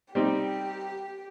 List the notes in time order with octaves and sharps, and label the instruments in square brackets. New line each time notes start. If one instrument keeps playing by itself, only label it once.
[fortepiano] G3 C4 D#4 [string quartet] G4